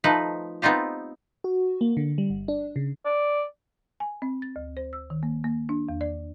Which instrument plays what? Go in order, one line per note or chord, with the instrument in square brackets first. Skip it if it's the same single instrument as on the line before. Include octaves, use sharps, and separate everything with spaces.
[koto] F3 A3 D#4 B4
B3 C4 D#4 F4 G4
[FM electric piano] F#4
A#3
D3
G3
G1
D4
C#3
[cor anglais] D5
[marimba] G#5
C4
A6
D2
C5
E6
D#3
A#3
A#3
D4
E2
D5